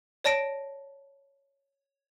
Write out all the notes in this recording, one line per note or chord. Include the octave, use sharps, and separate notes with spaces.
C#5 D5 A5 A#6 D7